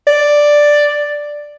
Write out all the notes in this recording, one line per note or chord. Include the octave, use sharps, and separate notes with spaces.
D5